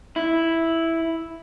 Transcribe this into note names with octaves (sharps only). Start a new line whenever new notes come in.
E4